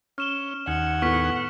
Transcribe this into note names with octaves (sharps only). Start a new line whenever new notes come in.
C#4 F6 E7 G7
D#2 F#5 G#5
A2 B3 C#6 F6 B6